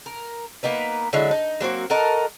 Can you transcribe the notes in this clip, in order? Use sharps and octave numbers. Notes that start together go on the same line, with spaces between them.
A#4
A#3 B3 D#4 B4
D3 F#3 G#3 E4
D#4
F#3 A#3 C4 F#4
F#4 A4 A#4 D#5